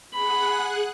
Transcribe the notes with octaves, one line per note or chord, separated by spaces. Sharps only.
G#4 F#5 B5 F#6